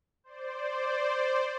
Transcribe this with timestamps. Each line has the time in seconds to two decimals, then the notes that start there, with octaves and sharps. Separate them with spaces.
0.24 C5 D5